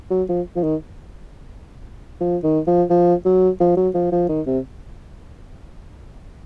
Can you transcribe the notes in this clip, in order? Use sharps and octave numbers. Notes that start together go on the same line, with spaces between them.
F#3
F3
F3
D#3
F3
D#3
F3
F3
F#3
F3
F#3
F3
F3
D#3
C3